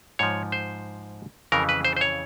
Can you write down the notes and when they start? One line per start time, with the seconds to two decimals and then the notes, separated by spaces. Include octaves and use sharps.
0.19 G#2 F3 C#5
0.52 C5
1.52 F2 C#3 E3 A#4
1.69 B4
1.85 C5
1.96 C5
2.01 C#5